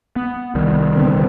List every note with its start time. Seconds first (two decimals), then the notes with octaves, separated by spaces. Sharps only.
0.16 B3
0.55 C2 D#3 G3
0.96 D3 B3 C4